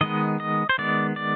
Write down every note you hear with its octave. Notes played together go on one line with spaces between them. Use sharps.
D#3 G#3 B3 D#5
D#5
C5
D#3 G#3 B3 D5
D5